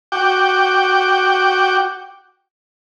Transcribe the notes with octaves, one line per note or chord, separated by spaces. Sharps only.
F#4 G5 D6